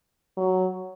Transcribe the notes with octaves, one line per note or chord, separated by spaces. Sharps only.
F#3